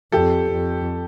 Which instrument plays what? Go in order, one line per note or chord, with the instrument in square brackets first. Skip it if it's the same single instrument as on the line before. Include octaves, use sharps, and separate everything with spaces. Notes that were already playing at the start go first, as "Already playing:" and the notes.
[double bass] F2 [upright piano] G4 A4
[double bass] F2